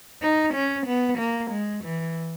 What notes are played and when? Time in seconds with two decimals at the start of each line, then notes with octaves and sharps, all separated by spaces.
0.22 D#4
0.54 C#4
0.87 B3
1.18 A#3
1.51 G#3
1.84 E3